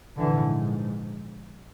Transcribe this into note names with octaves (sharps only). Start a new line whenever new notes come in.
A#1 G#2 D3 E3